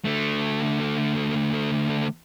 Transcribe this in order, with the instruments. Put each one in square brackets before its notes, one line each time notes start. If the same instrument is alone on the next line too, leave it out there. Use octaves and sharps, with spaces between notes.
[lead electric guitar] D3 A3